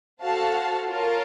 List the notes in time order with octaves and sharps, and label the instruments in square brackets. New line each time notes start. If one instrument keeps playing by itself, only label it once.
[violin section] F#4 A4 C5 F5 A5
F4 A#4 C#5 F5 A5